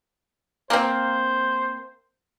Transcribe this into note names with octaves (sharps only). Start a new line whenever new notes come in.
A#3 C4 C5